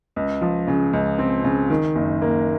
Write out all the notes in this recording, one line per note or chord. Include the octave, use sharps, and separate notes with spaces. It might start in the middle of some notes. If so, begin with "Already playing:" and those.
C#2
F3
C#3
C#2
C4
C#3
D#3
F#1
A#3